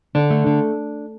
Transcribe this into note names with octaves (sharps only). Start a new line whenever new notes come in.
D3 D4
A3
D3